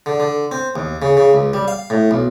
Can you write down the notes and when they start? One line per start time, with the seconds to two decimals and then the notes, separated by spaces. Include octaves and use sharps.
0.06 D3
0.20 D3
0.52 C4
0.76 D#2
1.02 C#3
1.17 C#3
1.33 C#2
1.54 G3
1.68 F5
1.90 A2
2.11 B1